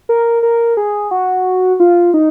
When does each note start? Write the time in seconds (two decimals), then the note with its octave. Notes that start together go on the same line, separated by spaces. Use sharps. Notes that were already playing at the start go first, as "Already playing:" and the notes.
0.09 A#4
0.43 A#4
0.77 G#4
1.11 F#4
1.80 F4
2.14 D#4